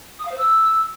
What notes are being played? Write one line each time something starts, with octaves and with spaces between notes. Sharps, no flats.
D#6
F5
C5
E6